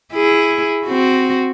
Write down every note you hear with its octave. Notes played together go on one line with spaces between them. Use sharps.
E4 G#4
C4 F#4